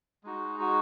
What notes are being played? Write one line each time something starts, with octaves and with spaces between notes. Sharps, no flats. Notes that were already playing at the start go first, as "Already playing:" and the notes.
G#3 D#4 F#4
F#4